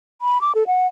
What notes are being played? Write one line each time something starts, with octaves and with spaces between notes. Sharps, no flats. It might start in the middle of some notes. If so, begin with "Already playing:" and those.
B5
D6
A4
F#5